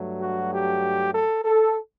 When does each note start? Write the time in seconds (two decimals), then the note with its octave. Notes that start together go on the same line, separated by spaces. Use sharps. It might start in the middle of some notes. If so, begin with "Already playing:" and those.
Already playing: G2 F#3 A3
0.21 F#4
0.53 G4
1.14 A4
1.45 A4